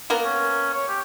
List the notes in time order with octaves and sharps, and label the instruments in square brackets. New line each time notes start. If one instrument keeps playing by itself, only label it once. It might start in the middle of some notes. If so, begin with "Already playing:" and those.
[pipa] A#3 B3 A#4
[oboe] C#4
C#5
G4